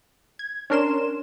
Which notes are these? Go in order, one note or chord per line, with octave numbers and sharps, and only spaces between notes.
G#6
C#4 D4 A#4 C6 E7